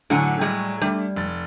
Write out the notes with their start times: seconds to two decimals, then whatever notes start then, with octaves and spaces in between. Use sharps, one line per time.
0.10 A2 D3 F#3 F#5 G#5
0.41 G3 G#3
0.81 G3 A3 D4
1.16 F1 A6